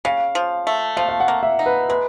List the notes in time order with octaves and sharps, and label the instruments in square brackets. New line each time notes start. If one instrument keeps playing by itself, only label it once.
[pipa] C#3 [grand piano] F5
[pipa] F3
A3
[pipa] F3 [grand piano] F5
[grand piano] F5
F#5
[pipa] A#3
[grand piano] E5
[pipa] D#4
[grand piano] B4
[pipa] G#3 [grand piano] B4